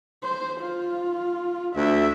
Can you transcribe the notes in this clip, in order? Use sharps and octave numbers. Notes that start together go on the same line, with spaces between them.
C5
F4
D2 E5